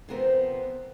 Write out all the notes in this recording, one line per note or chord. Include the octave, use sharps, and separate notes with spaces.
F2 C3 F3 B3 A#4 C5